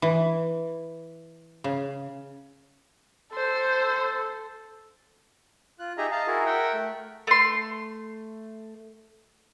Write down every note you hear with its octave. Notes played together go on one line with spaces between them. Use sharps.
E3
C#3
A4 C5
F4 F#6
D#4 G4 G#4 D#5 E5 A#5
D#5 F5 A5 A#5
E4 F#4 G#4 A#4
A#4 E5 F#5 G5
A3
A3 C6